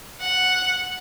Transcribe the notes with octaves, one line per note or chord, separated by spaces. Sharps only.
F#5